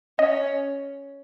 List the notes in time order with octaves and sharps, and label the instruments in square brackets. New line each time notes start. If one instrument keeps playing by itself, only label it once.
[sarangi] C#4 [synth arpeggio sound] D#5